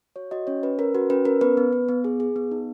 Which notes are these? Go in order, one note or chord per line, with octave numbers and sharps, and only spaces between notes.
F#4 C#5
F#4 D#5
C#4 C#5
C#4 B4
C#4 A#4
F#4 B4
C#4 B4
C#4 A#4
B3 B4
B3
B3
B3
G#4
G#4
B3
D#4